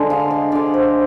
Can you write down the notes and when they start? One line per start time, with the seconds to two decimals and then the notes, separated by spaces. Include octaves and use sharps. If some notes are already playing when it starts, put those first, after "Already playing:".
Already playing: D3 G#3
0.10 F5
0.31 D#5
0.52 D3 G#3 D5
0.74 C5